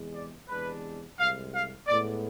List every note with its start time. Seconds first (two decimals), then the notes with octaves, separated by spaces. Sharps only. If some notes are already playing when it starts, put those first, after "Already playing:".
Already playing: E2 C3 G#3
0.14 D5
0.49 E2 C3 G#3 D4 B4
1.18 C2 C3 G#3 F5
1.52 F5
1.87 A2 G#3 B3 D5